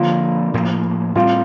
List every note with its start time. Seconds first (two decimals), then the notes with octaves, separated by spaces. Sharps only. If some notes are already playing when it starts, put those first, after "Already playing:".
Already playing: D3 F3 A#3 F4
0.54 A2 F3 A#3
1.15 A2 G3 C4 F4